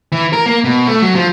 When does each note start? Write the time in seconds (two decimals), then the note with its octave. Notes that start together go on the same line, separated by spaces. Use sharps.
0.12 E3
0.33 A#4
0.46 A#3
0.64 B2
0.88 A3
1.02 F#3
1.15 F3